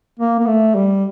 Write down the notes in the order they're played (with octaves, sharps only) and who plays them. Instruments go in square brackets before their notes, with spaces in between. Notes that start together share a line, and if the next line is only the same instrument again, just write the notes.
[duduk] A#3
A#3
A3
G3